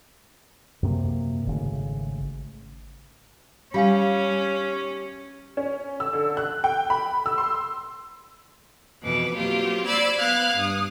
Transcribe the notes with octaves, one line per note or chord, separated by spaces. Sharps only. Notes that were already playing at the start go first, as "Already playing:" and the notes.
F#2 C3 A#3
G#1 C#3 A3
G3 C#4 F4 F5 G#5
C#4
E6
D3
F#6
G5
B5
E6
C6
F2 B2 E3 B4 D6
F#3 A#3 C4 F4 G4
C5 D5 B5 E6 G#6 A6
B3 F5 F#6 G#6
G2 D#6